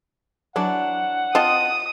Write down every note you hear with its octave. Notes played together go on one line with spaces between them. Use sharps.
E3 F#3 D4 F#5
C4 F4 D#5 A5 D#6